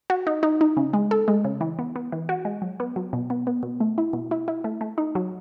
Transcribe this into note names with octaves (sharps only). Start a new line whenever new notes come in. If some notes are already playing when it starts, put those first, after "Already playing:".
F#4
D#4
D#4
D#4
C#3
G#3
A4
G#3
C#3
E3
B3
B3
E3
F#4
G#3
F#3
B3
F#3
B2
B3
B3
B2
A3
E4
B2
E4
E4
A3
A3
D#4
F#3